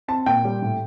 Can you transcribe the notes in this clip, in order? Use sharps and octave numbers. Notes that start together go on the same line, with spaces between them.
C4 A5
A#2 G5
G3
A2